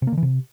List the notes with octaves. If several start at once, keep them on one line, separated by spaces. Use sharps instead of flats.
C3
A#3
D3
E3
C3